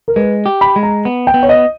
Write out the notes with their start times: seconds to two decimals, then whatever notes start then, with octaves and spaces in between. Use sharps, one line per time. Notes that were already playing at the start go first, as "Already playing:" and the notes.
0.08 A#4
0.16 G#3 B4
0.46 G4
0.61 B5
0.76 G#3
0.83 A#5
1.05 B3
1.27 G5
1.34 B3
1.43 C#5
1.49 D#5